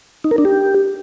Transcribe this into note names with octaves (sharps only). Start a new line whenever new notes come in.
D#4
A#4
D4
G4